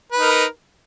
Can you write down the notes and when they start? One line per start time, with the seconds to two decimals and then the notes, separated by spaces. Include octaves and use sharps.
0.12 B4
0.17 D#4
0.21 A#4